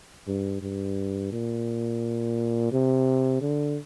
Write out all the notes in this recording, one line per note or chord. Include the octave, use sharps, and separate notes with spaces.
G2
G2
A#2
C3
D3